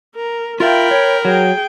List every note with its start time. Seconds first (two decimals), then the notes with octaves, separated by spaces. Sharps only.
0.16 A#4
0.60 F4 A#4 E5 F5 G5 B5
0.91 C#5
1.25 F#3 G#4 G5